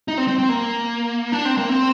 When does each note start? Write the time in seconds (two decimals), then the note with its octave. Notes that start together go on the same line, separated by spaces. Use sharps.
0.08 D#4
0.18 C4
0.28 C4
0.39 C4
0.49 A#3
1.32 D4
1.45 C4
1.57 A#3
1.69 C4